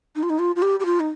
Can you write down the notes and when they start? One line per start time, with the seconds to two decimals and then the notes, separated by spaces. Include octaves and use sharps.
0.16 D#4
0.23 F4
0.30 D#4
0.39 F4
0.56 F4
0.62 G4
0.80 G4
0.85 F4
1.00 D#4